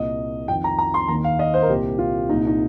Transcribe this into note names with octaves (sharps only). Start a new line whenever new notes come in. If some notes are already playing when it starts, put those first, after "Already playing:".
Already playing: C2 A#2 D#5
F2 D#3 G5
A#5
A#5
C6
D#2 D#3 A#5
F5
D#5
C5
A#4
C2 A#2 G4
F4
C2 A#2 D#4
D#4